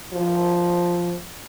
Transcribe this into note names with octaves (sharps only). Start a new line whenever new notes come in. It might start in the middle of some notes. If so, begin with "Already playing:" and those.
F3